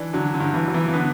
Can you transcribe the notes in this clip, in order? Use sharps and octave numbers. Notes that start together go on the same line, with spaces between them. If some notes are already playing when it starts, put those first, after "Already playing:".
Already playing: E3 D4
D3 F#3
D3
G2
E3
F#3
E3
E3
D3 B3